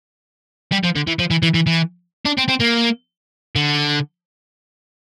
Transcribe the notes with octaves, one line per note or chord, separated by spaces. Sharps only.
G3
F3
D3
E3
F3
E3
E3
E3
E3
D4
C4
C4
A#3
D3